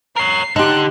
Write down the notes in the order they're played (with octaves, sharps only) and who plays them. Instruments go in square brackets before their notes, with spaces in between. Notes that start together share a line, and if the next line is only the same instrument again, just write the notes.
[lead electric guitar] A#4 C#5 [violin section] C7
[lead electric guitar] D3 [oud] D#4 G4 [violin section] C6 F#6